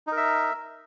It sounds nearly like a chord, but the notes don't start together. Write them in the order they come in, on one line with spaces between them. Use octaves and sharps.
D#4 A#4 E5